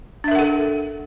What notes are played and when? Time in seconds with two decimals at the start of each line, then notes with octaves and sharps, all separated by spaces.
0.24 D4
0.28 E5
0.31 A#4
0.35 F#5
0.39 A4